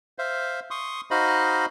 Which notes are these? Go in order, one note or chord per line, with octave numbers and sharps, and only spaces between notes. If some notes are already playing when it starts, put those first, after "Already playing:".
C5 E5 F5
C6 C#6 D#6
D#4 F#4 C5 D#5 F5 B5